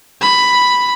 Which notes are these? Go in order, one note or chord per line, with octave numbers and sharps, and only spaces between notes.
B5